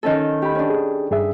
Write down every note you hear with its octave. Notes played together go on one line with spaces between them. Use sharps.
D#3 C#4 A4
G4 B5
C#4 D4
G#4
G2 G#4 E5